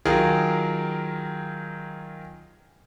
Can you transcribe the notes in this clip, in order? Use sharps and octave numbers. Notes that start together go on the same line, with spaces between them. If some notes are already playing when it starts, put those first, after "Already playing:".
D#3 F#3 F4 G#4 A#4